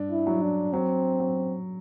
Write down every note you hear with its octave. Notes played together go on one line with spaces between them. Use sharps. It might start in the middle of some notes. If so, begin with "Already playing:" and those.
Already playing: G2 D4
E4
F#3
D4
F#3 C4
F#3